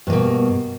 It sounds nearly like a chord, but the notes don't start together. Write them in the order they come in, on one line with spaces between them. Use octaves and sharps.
G2 A#3 B2